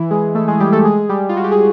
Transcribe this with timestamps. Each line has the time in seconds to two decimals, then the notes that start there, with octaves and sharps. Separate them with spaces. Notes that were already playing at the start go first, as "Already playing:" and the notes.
Already playing: E3 E4
0.11 G#3 G#4
0.35 A3 A4
0.48 G#3 G#4
0.60 G3 G4
0.73 A3 A4
0.85 G#3 G#4
1.09 G3 G4
1.29 F4
1.37 F#4
1.44 G4
1.51 G#4